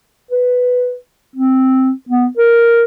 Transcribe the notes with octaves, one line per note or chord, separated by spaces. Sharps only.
B4
C4
B3
A#4